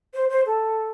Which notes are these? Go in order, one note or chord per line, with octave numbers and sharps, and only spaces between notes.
C5
C5
A4